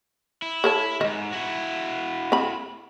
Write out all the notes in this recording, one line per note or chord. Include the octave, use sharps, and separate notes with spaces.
E4
A4 C#5 A5
E2 G#2 D#5
E4 F#4
C4 B5